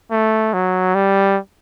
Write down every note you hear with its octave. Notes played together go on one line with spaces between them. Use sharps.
A3
F#3
G3